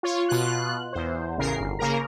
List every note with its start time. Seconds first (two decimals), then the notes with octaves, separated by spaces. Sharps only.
0.03 F4 C#5
0.29 B2 F4 F#6
0.93 E2 C5
1.38 A1 C#3 A#4 C7
1.60 G1
1.79 C#3 A#3 A#4 A#5